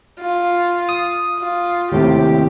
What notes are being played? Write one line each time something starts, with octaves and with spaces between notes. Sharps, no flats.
F4
D#6
F4
D#2 A2 C3 G4